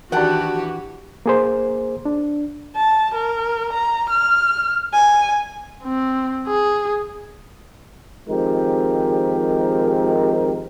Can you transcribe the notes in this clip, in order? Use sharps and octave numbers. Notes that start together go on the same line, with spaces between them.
D#3 E3 D4 F#4 G4 F#5 G5 A5
A#3 G#4 C5
D4
A5
A#4
A#5
F6
G#5
C4
G#4
D#3 F3 G#3 C4 G4 A#4